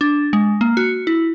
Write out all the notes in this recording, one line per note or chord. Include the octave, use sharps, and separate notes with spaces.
D4
G#3
A#3
F#4
E4